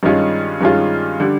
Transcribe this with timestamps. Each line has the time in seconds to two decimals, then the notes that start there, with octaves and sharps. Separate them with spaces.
0.03 G2 D#3 G#3 C#4 F4
0.61 G2 D#3 G#3 C#4 F4
1.20 D3 G3